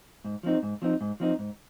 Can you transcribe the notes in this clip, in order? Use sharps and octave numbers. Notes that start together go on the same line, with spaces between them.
G#2
F3 C4 D#4
G#2
F3 C4 D#4
G#2
F3 C4 D#4
G#2